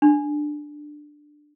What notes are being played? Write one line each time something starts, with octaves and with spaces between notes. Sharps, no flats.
D4